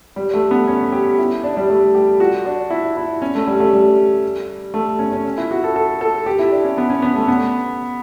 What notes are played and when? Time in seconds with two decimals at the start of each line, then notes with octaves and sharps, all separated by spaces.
0.16 G3
0.34 A3
0.51 B3
0.67 C#4
0.93 G4
1.19 E4
1.44 D4
1.57 G3
1.70 A3
1.95 G4
2.20 F#4
2.46 D4
2.70 E4
2.97 E4
3.22 C#4
3.35 A3
3.47 G3
3.60 A3
3.73 G3
4.74 A3
4.99 C#4
5.12 C#4
5.38 E4
5.51 F#4
5.64 A4
5.76 A4
6.01 A4
6.26 G4
6.39 E4
6.52 D4
6.64 C#4
6.78 B3
6.90 C#4
7.02 B3
7.16 A3
7.28 B3